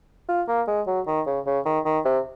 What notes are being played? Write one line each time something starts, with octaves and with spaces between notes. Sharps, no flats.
F4
A#3
G#3
F#3
D#3
C#3
C#3
D#3
D#3
C3